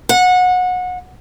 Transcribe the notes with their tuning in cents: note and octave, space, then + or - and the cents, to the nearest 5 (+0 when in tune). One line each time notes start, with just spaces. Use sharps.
F#5 -25